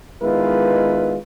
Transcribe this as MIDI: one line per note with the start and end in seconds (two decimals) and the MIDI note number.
0.23 1.17 51
0.23 1.17 56
0.23 1.17 59
0.23 1.17 64
0.23 1.17 65
0.23 1.17 71